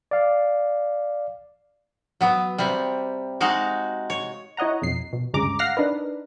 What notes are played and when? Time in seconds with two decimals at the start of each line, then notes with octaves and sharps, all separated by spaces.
0.11 D5 F5
2.21 F#3 B3
2.58 C3 G3
3.40 G#3 D#4 F#4 F5
4.10 C#5
4.57 E4 C#5 D#5 F#5 A#5
4.82 B1 F2 C7
5.13 B2
5.33 D2 G2 C#3 G#3 A#5 D6
5.59 F5 F#5 F6 A#6 C7
5.77 D4 D#4 A#4 B4